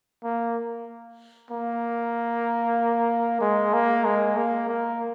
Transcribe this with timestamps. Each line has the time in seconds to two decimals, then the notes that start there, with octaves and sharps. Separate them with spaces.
0.24 A#3
1.51 A#3
3.41 G#3
3.73 A#3
4.05 G#3
4.37 A#3
4.69 A#3